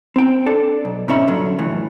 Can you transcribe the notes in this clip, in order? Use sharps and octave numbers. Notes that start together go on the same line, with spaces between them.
C4 G5
D4 A4
B1
G#2 B2 C#4 E5 B5
G2 A#2 D3 F#3
C#2 F#2 A2 E3